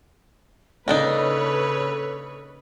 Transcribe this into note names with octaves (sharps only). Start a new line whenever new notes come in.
C#3 A#3 D4 D#4 A4 B4 C#5